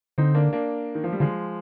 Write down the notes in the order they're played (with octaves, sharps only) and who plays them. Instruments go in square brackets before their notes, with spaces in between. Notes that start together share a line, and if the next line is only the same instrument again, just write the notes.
[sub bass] D3 [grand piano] C4 D#4
[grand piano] A#3 D4
A#3 D4
D#3
F3
G3
[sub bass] D3 [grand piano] F3 G#3